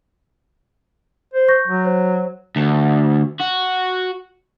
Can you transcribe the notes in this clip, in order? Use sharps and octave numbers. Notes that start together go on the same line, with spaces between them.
C5
C#6 G6 A#6
F#3
C5 C#5
D2
F#4